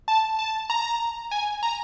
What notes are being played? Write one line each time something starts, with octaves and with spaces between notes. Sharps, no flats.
A5
A5
A#5
G#5
A#5